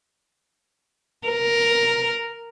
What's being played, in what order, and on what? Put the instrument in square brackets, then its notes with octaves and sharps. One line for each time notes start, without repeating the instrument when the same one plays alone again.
[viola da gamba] A#4